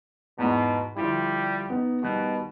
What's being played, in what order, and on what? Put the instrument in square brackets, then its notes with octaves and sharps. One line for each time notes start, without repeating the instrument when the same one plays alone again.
[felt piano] E2 G#2 [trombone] B2
[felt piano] D3 F3 E4 [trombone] G3
[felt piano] B3 D#4
[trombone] B2 [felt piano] D#3 G3 F#6